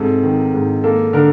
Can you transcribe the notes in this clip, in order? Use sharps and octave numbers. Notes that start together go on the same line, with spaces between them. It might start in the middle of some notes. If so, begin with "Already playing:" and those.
Already playing: G#2 C3 A4
D#3
G#2
A#3 A4
D3 A#4